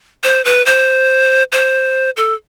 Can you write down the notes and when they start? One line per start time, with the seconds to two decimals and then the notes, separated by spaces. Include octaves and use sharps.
0.24 C5
0.45 B4
0.66 C5
1.52 C5
2.17 A4